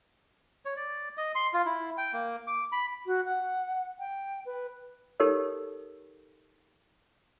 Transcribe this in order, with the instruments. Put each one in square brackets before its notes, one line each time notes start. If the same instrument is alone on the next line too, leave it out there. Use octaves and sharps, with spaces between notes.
[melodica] C#5
D5
D#5
C6
F4
E4
G5
A#3
D6
B5
[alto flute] F#4
F#5
G5
B4
[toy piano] D#4 G4 A4 A#4 C#5